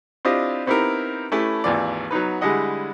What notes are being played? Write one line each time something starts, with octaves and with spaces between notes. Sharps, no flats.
C4 D4 E4 F4 G4 D#5
B3 C4 D#4 E4 G4 A#4
A3 C#4 E4 G4 A4 B4
G#1 D#2 E3 F4 D5
F#3 B3 D#4 B4
D3 G3 G#3 E4 D#5 F#5